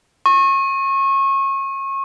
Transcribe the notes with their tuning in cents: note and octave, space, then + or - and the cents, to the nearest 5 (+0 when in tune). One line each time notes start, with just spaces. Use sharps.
C#6 -30